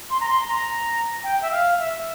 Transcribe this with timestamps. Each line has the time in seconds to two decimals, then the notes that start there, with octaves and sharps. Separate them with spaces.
0.10 C6
0.20 A#5
0.29 C6
0.48 A#5
1.23 G5
1.42 E5
1.51 F5
1.79 E5